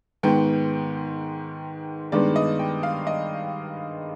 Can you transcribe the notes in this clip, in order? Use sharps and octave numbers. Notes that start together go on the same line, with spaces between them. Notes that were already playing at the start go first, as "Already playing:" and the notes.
G#2 D#3 G#3 B3 G5
G2 D#3 G#3 B3 D5
D#5
G5
F5
D#5